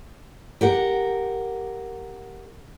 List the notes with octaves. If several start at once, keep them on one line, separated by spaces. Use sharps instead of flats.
G4 A#4 F#5